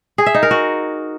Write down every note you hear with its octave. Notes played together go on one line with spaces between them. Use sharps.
G#4
E5
D#4
A#4
F#4